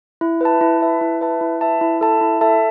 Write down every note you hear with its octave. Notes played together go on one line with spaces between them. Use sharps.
E4
B4 E5 A5
E4
B4 E5 A5
E4
B4 E5 A5
E4
B4 E5 A5
E4
A4 E5 A5
E4
A4 E5 A5